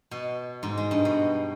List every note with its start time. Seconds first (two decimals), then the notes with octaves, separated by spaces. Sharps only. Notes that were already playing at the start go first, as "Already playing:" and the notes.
0.11 B2
0.63 G#2
0.78 G#3
0.91 G2
1.05 B2